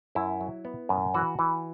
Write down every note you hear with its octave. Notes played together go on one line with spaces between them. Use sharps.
F#2 E4
F#3
B3
F#2
E3 F#4
E3